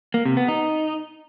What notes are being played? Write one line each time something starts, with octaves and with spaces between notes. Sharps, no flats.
A#3
C3
B3
D#4